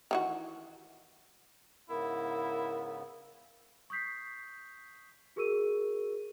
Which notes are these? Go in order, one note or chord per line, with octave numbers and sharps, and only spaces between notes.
D#3 E3 F#4
G#2 C#3 B3 E4 A#4
C#6 D#6 G6 B6 C7
F#4 G#4 A#4 C#6 E6 D#7